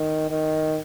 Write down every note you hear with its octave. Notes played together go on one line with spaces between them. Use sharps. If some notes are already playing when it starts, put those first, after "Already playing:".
Already playing: D#3
D#3